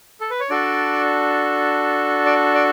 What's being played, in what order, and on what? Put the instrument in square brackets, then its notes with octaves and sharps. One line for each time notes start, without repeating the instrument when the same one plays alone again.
[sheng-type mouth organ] A4
B4
C#5
D4 F#4 A4 D5
D5
D5